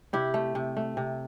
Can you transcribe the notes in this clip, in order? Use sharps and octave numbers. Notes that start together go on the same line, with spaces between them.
C3 E4 G4
A3
C3
A3
C3